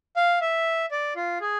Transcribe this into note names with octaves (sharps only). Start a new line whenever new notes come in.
F5
E5
D5
F4
G#4